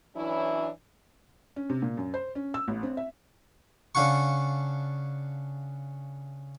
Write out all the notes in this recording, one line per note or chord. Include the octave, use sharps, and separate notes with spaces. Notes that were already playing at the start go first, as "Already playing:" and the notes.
E3 F#3 C#4 D4 E4
C#4
C3
A#2
F#2
C5
C#4
E6
A1
C4
E5
C#3 D4 F5 F#5 C#6